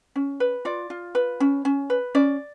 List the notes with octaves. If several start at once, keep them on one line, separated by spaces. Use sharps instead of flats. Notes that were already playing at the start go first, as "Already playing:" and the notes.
C#4
B4
F4 D5
F4
B4
C#4
C#4
B4
C#4 D5